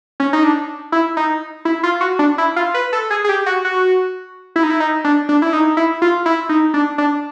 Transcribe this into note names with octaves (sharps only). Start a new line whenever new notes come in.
C#4
D#4
D4
E4
D#4
E4
F4
F#4
D4
E4
F4
B4
A4
G#4
G#4
G4
F#4
F#4
E4
D#4
E4
D#4
D4
D4
E4
D#4
E4
F4
E4
D#4
D4
D4